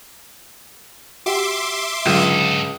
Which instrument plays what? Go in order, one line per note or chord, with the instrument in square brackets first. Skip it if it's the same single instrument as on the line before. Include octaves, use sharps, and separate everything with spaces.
[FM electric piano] F#4 G4 [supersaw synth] E5 C6 D6
[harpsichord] C#2 [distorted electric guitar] G#2 A4 [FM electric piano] D3 F#3 F4